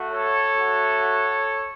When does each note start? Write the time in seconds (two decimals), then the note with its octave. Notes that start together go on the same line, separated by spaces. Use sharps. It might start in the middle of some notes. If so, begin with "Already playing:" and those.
Already playing: A3 F#4
0.09 A4 C#5
0.54 A3 F#4